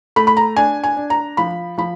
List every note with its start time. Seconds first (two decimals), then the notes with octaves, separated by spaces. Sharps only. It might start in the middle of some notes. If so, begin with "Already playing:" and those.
0.16 A3 B5
0.27 B5
0.37 A#5
0.56 D4 G#5
0.84 G#5
0.97 D4
1.10 A#5
1.37 F3 B5
1.78 F3 B5